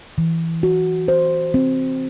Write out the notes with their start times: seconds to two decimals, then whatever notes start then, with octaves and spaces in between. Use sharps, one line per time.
0.18 E3
0.63 F#4
1.08 C5
1.54 C4